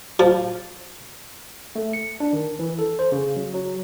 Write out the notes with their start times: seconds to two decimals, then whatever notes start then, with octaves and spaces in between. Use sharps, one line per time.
0.19 F3
1.76 A3
1.93 C#7
2.20 D4
2.33 D#3
2.59 E3
2.79 A4
2.99 C5
3.12 C#3
3.36 F#3
3.54 F#3